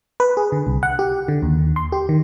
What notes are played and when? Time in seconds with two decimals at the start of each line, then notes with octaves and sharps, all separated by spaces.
0.20 B4
0.37 G#4
0.52 D3
0.67 C2
0.83 F#5
0.99 G4
1.28 D3
1.42 D#2
1.76 C6
1.92 G4
2.09 D#3